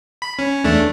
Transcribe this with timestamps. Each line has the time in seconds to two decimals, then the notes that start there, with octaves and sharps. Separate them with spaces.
0.22 B5
0.39 C#4
0.64 E2 A3 D4